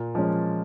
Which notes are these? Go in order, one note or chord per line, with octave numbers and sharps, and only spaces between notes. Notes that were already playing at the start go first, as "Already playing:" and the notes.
Already playing: A#2
F3 G#3 C#4